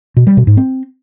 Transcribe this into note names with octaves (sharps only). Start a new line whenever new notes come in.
B2
G3
B2
G#2
C4